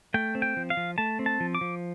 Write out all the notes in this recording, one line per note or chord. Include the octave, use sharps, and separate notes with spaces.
A3 G5
C4
G5
F3
F5
F3
A3 A5
C4
A5
F3
D6
F3